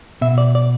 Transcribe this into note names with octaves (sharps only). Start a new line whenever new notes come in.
B2 E5
D5
D5